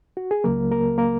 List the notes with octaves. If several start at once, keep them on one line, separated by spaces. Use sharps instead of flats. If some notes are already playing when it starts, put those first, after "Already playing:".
F#4
G#4
C#2 C#3 F#3 A#3 A#4
A#3 A#4
A#3 A#4